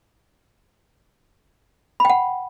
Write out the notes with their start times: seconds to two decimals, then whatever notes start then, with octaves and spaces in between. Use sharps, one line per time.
2.00 B5
2.05 G5
2.10 F#5